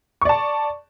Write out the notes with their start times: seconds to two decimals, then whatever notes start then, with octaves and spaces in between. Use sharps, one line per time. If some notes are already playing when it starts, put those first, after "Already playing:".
0.21 C#6
0.25 D5
0.29 A5